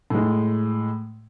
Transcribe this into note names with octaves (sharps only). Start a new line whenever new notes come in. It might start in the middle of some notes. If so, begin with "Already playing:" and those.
A2 G#3